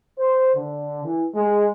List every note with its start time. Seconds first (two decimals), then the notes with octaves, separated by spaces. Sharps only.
0.19 C5
0.55 D3
1.04 E3
1.35 G#3